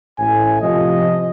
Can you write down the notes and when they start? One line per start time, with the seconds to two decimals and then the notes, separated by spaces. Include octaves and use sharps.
0.19 A1 A2 G#5
0.61 C3 F3 D#5